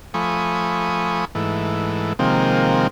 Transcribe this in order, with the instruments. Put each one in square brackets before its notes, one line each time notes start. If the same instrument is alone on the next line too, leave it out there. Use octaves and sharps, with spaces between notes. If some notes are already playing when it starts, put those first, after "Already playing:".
[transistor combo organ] F3 A3 G#5 B5 C#6 D#6
G#2 E3 A3
C3 D#3 F3 G#3 A#3 C4